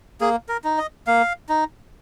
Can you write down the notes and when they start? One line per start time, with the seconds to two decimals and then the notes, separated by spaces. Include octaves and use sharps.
0.21 A#3 G#4
0.49 A#4
0.64 D#4
0.78 D#5
1.07 A#3 F5
1.49 D#4